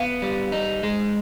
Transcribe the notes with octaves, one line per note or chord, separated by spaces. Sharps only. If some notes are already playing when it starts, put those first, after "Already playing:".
Already playing: B3 F5
G3
D#4
G#3